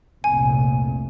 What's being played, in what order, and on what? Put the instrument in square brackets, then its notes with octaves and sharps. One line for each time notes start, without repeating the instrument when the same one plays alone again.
[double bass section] F1 C2 A#2 [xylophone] G#5